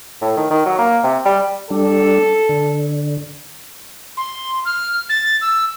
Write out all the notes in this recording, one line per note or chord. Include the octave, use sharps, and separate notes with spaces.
A2
D#3
D#3
F#3
A#3
C3
G3
G3 D4 A4
D3
C6
F6
A6
E6